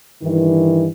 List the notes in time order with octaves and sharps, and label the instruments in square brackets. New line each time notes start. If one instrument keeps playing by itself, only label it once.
[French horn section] G2 D#3 E3